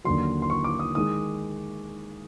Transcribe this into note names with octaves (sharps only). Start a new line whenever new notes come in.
D#2 D3 F#3 C6
C6
C#6
D6
D#6
D#3 G#3 D#6